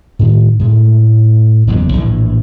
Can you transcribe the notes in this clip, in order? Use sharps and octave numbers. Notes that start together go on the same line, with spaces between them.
A2 D#3
A2 G#3 A3
F#1 E2 D3
A#1 A2 E3